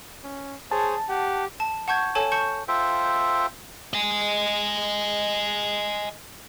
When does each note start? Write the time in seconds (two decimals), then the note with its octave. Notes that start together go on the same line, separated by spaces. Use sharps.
0.24 C#4
0.71 G#4 C5 C#5 A5
1.09 G4 F#5
1.60 A5
1.88 F#5 A5 C#6 G6 G#6
2.15 A4 C#5 G#5 A5
2.32 A5 C#6 G6 C#7
2.68 F4 A4 C5 E5 G5
3.94 D#5 G#5